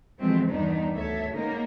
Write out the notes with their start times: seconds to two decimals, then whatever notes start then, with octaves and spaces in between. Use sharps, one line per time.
0.19 B2 E3 F3 G#3 A3 C4
0.50 E2 G2 D#3 B3 D4 D#4
0.94 D2 G3 A4 C#5 E5
1.34 G#3 A#3 B3 C#4 D#4 A#4